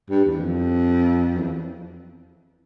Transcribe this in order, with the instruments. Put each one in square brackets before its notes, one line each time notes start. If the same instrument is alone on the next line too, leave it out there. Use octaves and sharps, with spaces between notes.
[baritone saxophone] G2
E2
F2
E2